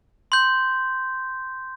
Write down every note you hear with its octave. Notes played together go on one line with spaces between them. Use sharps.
C6 G6